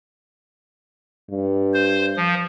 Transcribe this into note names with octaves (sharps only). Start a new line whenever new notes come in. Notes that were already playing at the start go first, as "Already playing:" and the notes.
G2
C5
F3